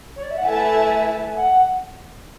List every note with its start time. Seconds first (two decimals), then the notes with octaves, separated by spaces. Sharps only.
0.16 C#5
0.22 D5
0.30 E5
0.37 F#5
0.44 A3 E4 B4 E5 G#5 A5
1.28 G#5
1.36 F#5